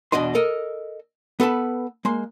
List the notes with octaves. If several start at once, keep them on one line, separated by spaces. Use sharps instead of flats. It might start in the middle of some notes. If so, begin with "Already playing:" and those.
E2 B2 D4 F#4 D#5 C6
A4 A#4 D#5
B3 A4 B4 A5 B5
G#3 A#3 C6